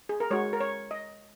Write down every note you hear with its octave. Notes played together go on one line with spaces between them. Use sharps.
G#4
A#4
G#3 F#4 C#5
A#4
C#5
D#5